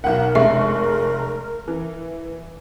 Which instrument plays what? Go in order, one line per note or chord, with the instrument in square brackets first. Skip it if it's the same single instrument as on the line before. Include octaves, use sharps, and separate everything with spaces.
[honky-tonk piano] B1 F#5 [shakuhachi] A#4
[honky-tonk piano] F1 G#3 C#6 [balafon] E5
[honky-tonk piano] E3